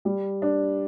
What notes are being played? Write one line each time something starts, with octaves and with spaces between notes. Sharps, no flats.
G3
D4